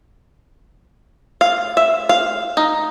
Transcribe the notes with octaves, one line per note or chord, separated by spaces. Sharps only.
F5
E5
F5
D#4